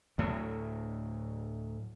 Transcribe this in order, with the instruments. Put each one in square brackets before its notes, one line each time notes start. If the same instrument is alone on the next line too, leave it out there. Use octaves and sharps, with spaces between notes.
[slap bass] D2 A2 F#3